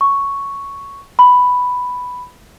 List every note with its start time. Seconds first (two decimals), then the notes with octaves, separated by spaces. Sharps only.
0.01 C#6
1.19 B5